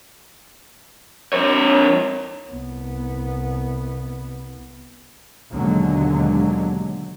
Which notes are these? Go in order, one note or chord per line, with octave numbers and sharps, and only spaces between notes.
F2 C#5
C2 B3
D#2 B2 D3 F#3 G#3